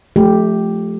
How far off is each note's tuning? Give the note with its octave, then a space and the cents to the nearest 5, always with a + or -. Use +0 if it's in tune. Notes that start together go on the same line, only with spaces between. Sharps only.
F3 +5 A3 -25 G4 +0